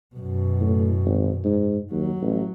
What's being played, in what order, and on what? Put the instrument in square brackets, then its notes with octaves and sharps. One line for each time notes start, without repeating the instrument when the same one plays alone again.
[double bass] F#2 B2
[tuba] A2
G#1
G#2
[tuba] D#2 [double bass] F#3
[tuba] A1